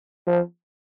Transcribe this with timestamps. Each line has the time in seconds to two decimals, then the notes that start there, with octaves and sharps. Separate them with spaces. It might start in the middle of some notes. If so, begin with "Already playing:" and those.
0.27 F3